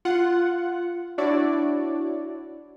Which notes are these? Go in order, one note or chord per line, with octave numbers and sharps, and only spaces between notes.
F4 F#5
D4 E4 F#4 C#5 D5